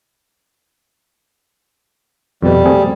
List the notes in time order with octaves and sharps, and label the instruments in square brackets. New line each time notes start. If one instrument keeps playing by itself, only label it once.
[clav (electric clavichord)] F2 B2 [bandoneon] G3
[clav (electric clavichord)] A3 C4 G#4